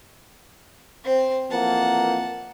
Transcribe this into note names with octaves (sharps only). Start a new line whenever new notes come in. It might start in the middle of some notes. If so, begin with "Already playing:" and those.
C4 C5
F2 E3 A#3 F#5 A5